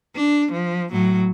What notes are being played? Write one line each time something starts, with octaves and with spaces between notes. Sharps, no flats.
D4
F3
A2 F#3